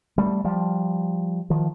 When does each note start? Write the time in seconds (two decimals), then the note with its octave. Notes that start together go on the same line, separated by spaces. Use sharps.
0.18 G3 A3
0.44 F3 G3
1.50 D#3 F3